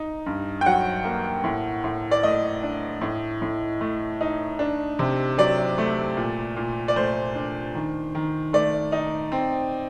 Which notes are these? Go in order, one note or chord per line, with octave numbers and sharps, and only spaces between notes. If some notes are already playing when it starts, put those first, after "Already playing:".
Already playing: D#4
G2
G5
F#3 F#5
A#3
A2
A2
D5
A3 D#5
D4
A2
A2
A3
D#4
D4
C3
F#3 D5
A3
A#2
A#2
D5
A3 C5
D4
D#3
D#3
A3 D5
D#4
C4